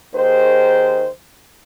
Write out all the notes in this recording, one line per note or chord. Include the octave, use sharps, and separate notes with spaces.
D#2 D#3 G#4 C5